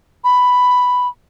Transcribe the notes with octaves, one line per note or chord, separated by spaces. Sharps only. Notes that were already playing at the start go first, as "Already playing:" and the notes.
B5